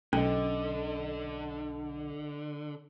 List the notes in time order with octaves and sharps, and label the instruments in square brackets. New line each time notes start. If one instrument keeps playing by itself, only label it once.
[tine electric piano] B1 [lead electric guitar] D3 [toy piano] C#4 [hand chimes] A4 D#5